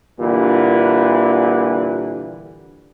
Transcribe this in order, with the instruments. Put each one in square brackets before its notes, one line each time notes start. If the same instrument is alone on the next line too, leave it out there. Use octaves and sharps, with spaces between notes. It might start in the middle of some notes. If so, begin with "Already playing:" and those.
[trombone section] A#2 D3 E3 G3